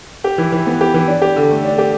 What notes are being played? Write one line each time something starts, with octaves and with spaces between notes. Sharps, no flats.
G4
E3
E3
B3
G4
E3
D4
G4
D3
A3
D4
G4